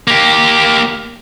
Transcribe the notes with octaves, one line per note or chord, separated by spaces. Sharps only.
A#3 G4